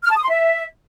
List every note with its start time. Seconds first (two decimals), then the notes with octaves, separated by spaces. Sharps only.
0.05 F6
0.11 A5
0.17 D#6
0.23 C6
0.30 E5